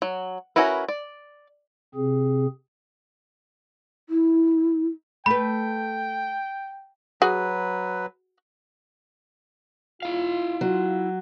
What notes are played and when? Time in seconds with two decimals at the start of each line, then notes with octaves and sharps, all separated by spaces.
0.02 F#3
0.56 C#4 E4 F#4 A#4 B4
0.88 D5
1.95 C3 C4 G#4
4.09 E4
5.26 A3 B4 G5 B5
7.22 F#3 F#4 G#4 B4
10.02 E4 F4 F5
10.61 F#3